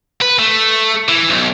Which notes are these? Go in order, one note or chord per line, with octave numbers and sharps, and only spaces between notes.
B4
A3
E3
B1